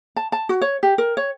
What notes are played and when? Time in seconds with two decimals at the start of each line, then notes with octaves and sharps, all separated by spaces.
0.16 A5
0.32 A5
0.49 F#4
0.61 C#5
0.83 G4
0.98 A#4
1.17 C#5